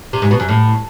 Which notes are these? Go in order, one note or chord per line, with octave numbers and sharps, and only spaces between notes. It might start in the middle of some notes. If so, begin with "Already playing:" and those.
C3
G#2
B2
F#2
A2